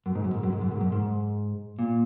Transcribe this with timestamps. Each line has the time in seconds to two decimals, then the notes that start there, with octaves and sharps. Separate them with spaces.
0.06 F#2
0.15 G#2
0.24 F#2
0.34 G#2
0.43 F#2
0.53 G#2
0.61 F#2
0.71 G#2
0.81 F#2
0.92 G#2
1.79 A#2